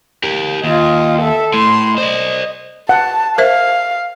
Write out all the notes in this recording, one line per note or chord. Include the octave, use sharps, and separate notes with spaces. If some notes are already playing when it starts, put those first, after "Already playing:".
G4 A#4
D#2 F4 D#5
A4 E5
A2 C6
C5 D5 D#5
F#5 A5
A#4 C5 E5 F5